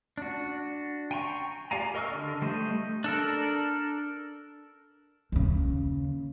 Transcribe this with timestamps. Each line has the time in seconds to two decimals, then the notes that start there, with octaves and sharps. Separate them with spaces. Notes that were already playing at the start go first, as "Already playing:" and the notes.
0.18 D4 F#4
1.11 G5 G#5 A#5 C6 C#6
1.71 G4 D5 F5 G#5 A#5
1.94 A#4 D#5 C#6 E6 F6
2.11 D3 D4
2.42 G3 A3 C5 D#5
3.04 D4 A4 A#4
5.32 D#2 C#3